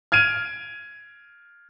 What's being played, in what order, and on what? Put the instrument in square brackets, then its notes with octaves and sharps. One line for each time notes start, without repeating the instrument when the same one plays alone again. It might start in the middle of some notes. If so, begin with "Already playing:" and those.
[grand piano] F6 G#6 D7 D#7